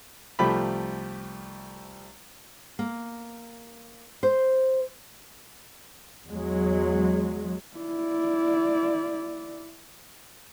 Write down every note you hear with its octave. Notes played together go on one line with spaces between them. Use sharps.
C2 F3 A3 G4 B5
A#3
C5
E2 F#3 G#3
E4 D5